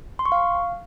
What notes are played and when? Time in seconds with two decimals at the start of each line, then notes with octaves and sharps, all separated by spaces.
0.19 C6
0.26 C#6
0.32 F5